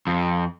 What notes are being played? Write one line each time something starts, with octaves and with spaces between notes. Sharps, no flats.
F2